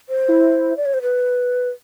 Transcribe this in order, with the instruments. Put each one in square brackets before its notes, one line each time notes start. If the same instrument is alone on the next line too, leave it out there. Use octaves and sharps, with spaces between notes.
[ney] C5
[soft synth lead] E4
[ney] D5
C#5
C5
B4